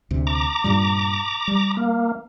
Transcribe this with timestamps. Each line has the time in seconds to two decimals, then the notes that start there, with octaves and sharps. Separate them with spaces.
0.11 D2 C3
0.27 A#5 D6
0.64 G2 A#2 G3
1.48 G3
1.77 A#3